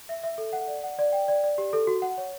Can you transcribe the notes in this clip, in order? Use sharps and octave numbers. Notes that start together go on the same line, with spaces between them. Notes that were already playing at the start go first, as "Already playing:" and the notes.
E5
E5
A4
F#5
D5
F#5
D5
G5
D5
D5
G4
A4
F#4
F#5
C#5